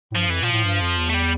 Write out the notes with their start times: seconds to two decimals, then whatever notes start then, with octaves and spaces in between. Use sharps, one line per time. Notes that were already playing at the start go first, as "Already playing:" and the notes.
0.12 A2
0.15 G2 F3
0.28 F2 E3
0.41 A#2 F3
0.52 A2
0.65 G2
0.81 F2
0.98 E2
1.09 A3
1.14 G3